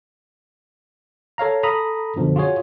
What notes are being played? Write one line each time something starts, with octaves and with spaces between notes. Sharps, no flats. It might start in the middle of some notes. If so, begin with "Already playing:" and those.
A4 C#5 F5 A#5
A4 A#5 B5 D#6
F#2 B2 D3 F3
F4 F#4 G#4 C#5